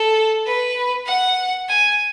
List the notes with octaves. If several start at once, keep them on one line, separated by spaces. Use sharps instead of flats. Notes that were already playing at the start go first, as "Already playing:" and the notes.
Already playing: A4
B4
F#5
G#5